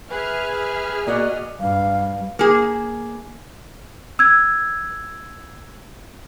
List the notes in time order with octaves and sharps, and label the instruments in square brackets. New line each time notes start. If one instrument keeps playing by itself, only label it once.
[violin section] G#4 E5 F6 [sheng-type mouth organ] B4
[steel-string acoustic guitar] A#3 F#4 F#5 [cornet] D5 [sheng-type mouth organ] D#5
[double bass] G2 [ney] F5
[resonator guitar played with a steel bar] A#3 G#4
[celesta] E6 G#6